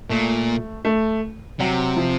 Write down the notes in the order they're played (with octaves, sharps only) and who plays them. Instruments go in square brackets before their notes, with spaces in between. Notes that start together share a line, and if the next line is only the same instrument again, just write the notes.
[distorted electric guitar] A#2 [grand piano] A3
[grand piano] A3
[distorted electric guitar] C3 [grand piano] F#3
[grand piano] F3